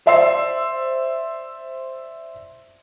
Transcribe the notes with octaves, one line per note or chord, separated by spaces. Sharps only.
C5 D5 E5 C6 E6 C7